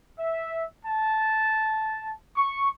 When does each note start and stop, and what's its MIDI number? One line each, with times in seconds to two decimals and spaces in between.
0.18 0.63 76
0.85 2.11 81
2.34 2.69 85